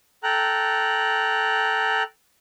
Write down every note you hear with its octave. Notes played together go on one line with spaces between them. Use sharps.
A4 G5 A#5 F#6